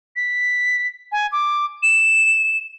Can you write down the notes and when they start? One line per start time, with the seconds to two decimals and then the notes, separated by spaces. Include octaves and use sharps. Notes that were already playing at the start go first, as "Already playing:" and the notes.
0.16 B6
1.12 G#5
1.32 D6
1.83 E7